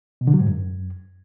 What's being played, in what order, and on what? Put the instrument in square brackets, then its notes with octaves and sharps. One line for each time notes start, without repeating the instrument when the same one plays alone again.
[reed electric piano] B2
D3
F#3
G#2
F#2